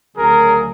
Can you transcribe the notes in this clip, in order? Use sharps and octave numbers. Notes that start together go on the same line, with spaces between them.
D2 C#3 F#3 G#4 A#4